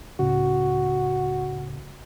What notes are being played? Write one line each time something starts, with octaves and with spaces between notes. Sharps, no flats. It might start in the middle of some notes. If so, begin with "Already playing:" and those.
C#2 A2 C#3 F#4